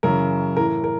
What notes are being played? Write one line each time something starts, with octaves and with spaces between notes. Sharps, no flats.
F#2 C#3 E3 A#4
A2 E3 A#4
A#4